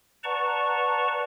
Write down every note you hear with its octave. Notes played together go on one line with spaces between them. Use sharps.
B4 D5 F#5 A5 A#5 C#6